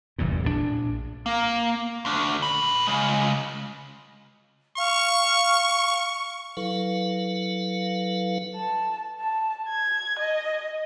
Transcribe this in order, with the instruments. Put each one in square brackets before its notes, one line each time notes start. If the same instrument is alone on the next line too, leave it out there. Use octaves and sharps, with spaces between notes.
[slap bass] F1 E2 G2 A#2
A#1 A2 C#3 D4
[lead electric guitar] A#3
D2 D4
A#2 B5
C#3 G#3
[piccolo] F5 [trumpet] C#6
[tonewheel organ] F#3 E4 A4 B4 F5
[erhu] A5
A5
G#6
D#5